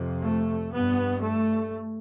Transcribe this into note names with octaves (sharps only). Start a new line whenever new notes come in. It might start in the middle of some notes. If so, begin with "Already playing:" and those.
Already playing: F2 C3
A3
G2 B3
A3